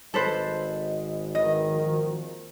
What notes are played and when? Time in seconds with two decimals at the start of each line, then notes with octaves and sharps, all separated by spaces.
0.14 G#1 A4 B4 C5 D#5
1.35 D#3 E3 E4 B4 D#5
1.68 F3 A#3 F#4